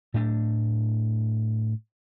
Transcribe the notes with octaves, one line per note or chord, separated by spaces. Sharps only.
A2 A3 D4